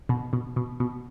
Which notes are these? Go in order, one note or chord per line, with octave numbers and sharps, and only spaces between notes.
B2
B2
B2
B2